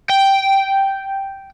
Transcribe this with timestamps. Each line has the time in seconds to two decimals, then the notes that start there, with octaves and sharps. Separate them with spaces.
0.09 G5